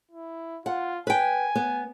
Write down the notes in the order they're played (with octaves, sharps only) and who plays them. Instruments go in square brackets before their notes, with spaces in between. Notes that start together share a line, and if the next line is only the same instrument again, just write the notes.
[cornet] E4
[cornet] F4 [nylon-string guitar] F#5
[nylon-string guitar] B4 G5 [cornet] G#5
[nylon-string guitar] B3